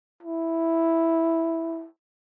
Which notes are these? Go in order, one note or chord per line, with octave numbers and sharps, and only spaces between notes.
E4